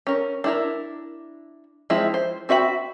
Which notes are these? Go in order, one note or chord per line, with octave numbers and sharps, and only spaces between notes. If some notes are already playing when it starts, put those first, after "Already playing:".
C#4 A#4
D4 E4 A#4
F3 G#3 C4 E4
C5
C4 F#4 E5 F5 B5